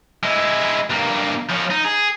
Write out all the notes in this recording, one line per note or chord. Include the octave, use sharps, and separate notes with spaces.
G#3 E4
G2 A#3
F3 C#4
D#4
G#4